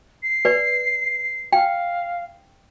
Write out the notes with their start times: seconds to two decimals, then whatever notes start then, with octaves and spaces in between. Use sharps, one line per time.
0.22 C7
0.45 B4 D5
1.53 F5 G5